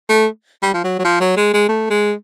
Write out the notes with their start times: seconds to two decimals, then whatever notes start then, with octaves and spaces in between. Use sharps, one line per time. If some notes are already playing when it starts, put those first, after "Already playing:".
0.09 A3
0.63 G3
0.74 F3
0.84 F#3
0.99 F#3
1.05 F3
1.21 F#3
1.37 G#3
1.54 G#3
1.69 A3
1.90 G#3